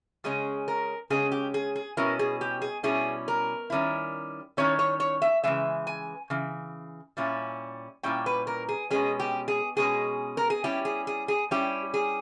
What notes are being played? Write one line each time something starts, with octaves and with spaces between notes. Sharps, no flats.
C#3 G#3 C#4 G#4
A#4
C#3 G#3 C#4 G#4
G4
G#4
G#4
B2 G3 C#4 E4 A#4
G#4
G4
G#4
B2 G3 C#4 E4 G#4
A#4
D#3 G3 C#4 E4
D#3 G3 C#4 E4 C#5
C#5
C#5
E5
C#3 E3 G#3 E5
G#5
C#3 E3
A#2 G3 C#4 E4
A#2 G3 C#4 E4 G5
B4
A#4
G#4
B2 G#3 C#4 G#4
G4
G#4
B2 G#3 C#4 G#4
A#4
G#4
G3 C#4 E4 G4
G#4
G#4
G#4
G3 C#4 E4 G4
G#4